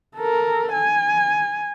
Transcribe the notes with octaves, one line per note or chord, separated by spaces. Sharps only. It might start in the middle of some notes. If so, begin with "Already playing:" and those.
A4 A#4
G#5